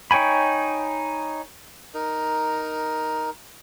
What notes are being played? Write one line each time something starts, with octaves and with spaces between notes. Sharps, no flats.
D#4 C#5 G5 G#5 B5
D#4 A#4